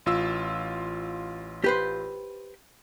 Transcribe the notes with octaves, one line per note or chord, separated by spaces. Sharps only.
A1 F4 E6
G4 B4 C5